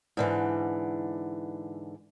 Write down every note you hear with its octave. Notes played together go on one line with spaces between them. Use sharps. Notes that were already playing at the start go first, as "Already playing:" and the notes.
G#2 D3 E3